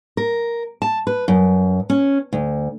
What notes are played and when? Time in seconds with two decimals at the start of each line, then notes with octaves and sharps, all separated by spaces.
0.17 A#4
0.82 A5
1.07 B4
1.28 F#2
1.90 C#4
2.33 D2